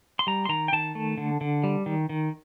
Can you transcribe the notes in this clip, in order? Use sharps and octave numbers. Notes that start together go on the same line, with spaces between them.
C6
G3 A#5
C6
D#3 A#5
G5
D#3 A5
A3
D3
D3
G3
D#3
D#3